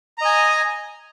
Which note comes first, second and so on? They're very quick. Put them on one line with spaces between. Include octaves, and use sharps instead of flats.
A#5 D#5 G#5